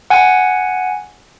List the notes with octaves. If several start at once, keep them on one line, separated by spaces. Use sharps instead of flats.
F#5 G#5